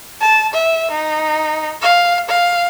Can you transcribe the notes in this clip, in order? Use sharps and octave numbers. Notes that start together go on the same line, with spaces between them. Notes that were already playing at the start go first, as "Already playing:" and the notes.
A5
E5
D#4
F5
F5